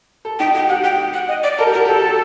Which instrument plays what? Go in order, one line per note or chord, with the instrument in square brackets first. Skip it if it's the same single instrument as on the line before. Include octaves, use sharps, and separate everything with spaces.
[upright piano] A4
[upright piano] D#4 [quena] G5
[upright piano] F#4 [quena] G5
[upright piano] G4 [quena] F#5
[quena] G5
F#5
D#5
D5
[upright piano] A4 [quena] A#4
[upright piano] G4
[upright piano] F#4 [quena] A#4
[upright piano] G4 [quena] A4